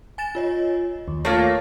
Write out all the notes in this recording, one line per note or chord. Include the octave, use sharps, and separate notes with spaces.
G#5 A6 E7
F4 C#5 D#5
D#2
A3 A#3 F4 C#5 C7